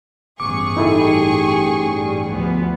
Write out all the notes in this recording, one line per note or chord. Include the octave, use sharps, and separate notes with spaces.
A1 G2 B3 G#4 C#6 D6
D#4 E4 G4 A4
G3
D2 F3 B3